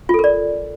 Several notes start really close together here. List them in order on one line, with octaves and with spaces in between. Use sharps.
F4 A4 A#4 D5